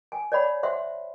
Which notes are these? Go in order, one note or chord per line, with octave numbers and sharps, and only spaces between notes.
G#5
C#5 D5 F#5 B5
C5 E5 F#5 C6